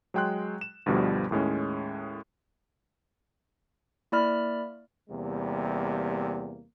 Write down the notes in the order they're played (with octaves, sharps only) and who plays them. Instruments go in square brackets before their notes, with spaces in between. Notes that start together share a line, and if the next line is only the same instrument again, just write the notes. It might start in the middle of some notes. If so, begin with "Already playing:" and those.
[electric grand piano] F#3 G#3 G5 C6 F#6
E7
D2 G2 B2 F3 G3
D#2 A2 G#3 C#4
[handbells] A#3 E4 D5 B5 F6
[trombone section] E2 C3 G3 A#3